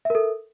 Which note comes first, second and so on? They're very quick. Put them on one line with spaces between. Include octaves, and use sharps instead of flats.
E5 A#4 A4